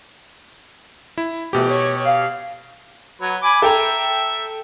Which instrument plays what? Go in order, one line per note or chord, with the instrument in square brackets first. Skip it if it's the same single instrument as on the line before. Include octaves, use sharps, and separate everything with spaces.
[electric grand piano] E4
[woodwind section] F2 E3 A3 [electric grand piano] B2 G4
[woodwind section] C#5
F5
[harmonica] F#3 B4
G#5 B5 D6
[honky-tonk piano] A4 G5 A#5 [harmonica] E5